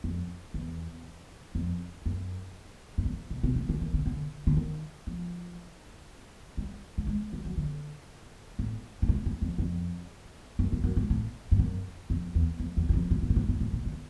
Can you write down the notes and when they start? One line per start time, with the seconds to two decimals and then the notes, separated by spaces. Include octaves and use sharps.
0.04 F2
0.54 E2
1.55 F2
2.06 F#2
2.98 G2
3.05 F#2
3.30 B2
3.43 C3
3.56 C#3
3.69 D3
3.81 D#3
3.94 C#3
4.06 D3
4.47 D3
4.57 D#3
5.07 F3
6.57 G3
6.98 A3
7.07 G#3
7.33 G3
7.45 F#3
7.57 D3
8.59 A2
9.02 A2
9.08 G#2
9.26 G2
9.42 F2
9.58 F2
10.59 F#2
10.72 G2
10.84 F#2
10.96 G#2
11.10 A2
11.52 G2
11.59 F#2
12.10 F2
12.35 E2
12.60 F2
12.77 E2
12.89 E2
12.93 F2
13.11 G2
13.22 G#2
13.30 A2
13.36 G#2
13.49 G#2
13.60 A2
13.73 A#2
13.86 D#3